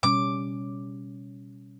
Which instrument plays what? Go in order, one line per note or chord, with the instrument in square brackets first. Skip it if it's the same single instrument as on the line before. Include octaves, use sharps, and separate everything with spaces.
[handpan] B2 G3 C#4 [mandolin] D6